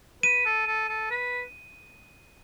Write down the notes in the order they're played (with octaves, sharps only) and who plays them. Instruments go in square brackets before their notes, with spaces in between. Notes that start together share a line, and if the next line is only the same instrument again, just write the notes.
[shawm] B4 [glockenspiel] D#7
[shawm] A4
A4
A4
B4